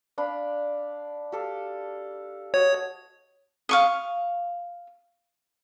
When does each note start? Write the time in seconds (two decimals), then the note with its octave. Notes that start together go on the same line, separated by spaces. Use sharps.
0.18 D4 F5 B5
1.32 G4 A4 F5
2.54 F#4 C#5 D#5 F#5
3.69 F5 C#6 D#6